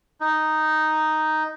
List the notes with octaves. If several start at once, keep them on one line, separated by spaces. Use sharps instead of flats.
D#4